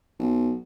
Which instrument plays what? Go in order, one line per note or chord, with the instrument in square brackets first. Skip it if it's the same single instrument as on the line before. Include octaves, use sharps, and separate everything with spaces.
[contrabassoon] B1